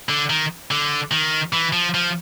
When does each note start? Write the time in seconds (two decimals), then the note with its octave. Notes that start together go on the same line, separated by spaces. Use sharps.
0.09 D3
0.30 D#3
0.71 D3
1.11 D#3
1.53 E3
1.73 F3
1.94 F3